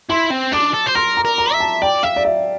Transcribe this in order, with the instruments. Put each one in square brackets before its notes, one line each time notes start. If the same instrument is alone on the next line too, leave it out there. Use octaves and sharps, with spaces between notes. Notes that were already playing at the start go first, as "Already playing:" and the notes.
[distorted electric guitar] E4 [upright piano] C6
[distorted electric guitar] C4
[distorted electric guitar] D4 [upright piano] D6
[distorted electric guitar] A4
C5
[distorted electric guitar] A#4 [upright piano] C6
[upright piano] A#5
[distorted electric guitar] A#4
[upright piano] A#5
[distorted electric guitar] E5
[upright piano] A5
[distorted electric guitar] D5 [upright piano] G5
[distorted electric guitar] E5 [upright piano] F5
[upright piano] D5
E5